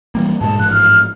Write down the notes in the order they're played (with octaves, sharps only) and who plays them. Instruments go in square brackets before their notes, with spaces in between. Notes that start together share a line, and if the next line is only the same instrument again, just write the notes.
[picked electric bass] E3 G3 A#3
[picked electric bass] G#2 B2 G#3 [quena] A5
[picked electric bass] A1 G#2 F3 [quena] F#6
[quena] F6